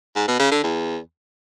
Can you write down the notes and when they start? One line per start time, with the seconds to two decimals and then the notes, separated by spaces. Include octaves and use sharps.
0.16 G#2
0.28 B2
0.40 C#3
0.51 D3
0.63 E2